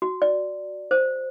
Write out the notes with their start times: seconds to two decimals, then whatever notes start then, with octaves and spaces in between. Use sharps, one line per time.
0.02 F#4
0.22 D5
0.91 C5